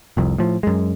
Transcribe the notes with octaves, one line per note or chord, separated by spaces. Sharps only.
F1 C2 F2
A2 F3
F#2 G#3